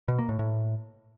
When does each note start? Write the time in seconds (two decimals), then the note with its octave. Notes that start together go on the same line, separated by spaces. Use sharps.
0.08 B2
0.19 A#3
0.29 A2
0.39 A2